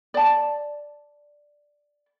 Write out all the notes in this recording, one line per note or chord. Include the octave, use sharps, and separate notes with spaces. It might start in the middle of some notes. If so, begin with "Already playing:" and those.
D5 A5